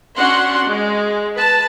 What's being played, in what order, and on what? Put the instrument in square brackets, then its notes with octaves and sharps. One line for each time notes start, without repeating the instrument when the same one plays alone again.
[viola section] C#4 D4 F#4 F#5 C6
G#3
B4 A5